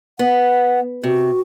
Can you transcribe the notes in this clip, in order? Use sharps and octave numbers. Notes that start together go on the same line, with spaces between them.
B3 F#5
C3 F#4